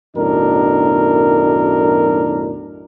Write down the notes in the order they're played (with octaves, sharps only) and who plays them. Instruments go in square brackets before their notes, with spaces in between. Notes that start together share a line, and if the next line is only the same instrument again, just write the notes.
[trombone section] B1 F#2 A2 D#3 D4 A#4